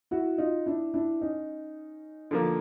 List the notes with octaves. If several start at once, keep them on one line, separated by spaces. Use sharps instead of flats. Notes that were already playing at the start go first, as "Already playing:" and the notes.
E4 F#4
D#4 F4
D4 E4
D4 E4
C#4 D#4
D3 F3 A#3